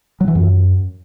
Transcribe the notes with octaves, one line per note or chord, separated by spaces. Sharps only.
F#3
E3
F#2